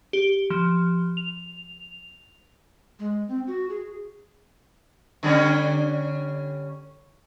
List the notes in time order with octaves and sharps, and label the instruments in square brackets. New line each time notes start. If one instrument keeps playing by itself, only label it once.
[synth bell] G4
F3
F7
[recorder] G#3
C4
F#4
G#4
[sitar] D3 G3 C#4